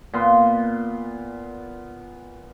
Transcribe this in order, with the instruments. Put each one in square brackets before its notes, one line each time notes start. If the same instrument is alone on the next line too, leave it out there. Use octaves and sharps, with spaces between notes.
[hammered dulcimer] A#2 B3 C6